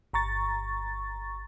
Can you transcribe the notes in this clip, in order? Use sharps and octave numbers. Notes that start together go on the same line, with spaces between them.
G1 A#5 C#6 A6